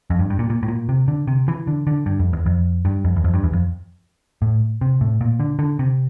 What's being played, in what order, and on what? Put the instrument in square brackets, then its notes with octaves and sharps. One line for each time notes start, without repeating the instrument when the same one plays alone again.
[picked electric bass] F2
G2
G2
A#2
A#2
A2
A#2
C3
D3
C3
E3
D3
D3
G2
F2
E2
F2
G2
F2
E2
F2
G2
E2
F2
A2
C3
A2
A#2
D3
D3
C3